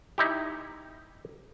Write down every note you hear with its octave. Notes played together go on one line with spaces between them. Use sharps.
D#4 E4 G4